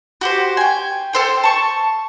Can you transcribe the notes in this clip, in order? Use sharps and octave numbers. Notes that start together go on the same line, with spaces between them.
F#4 G4 C5
G5 G#5
A4 C5 G5
A5 C#6